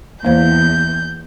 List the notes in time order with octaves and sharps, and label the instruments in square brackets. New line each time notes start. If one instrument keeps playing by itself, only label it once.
[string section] E2 [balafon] A#3 C5 F5 [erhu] G6